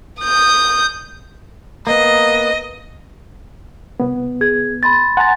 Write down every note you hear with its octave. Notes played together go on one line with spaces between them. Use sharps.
D#6 G6
A#3 B3 D#5
C2 B3
G#4 G#6
B5 C6 A6
F#5 G#5 A#5 C6 A6